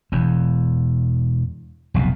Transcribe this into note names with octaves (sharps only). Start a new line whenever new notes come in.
E1 E2
F1 B1 F2 B2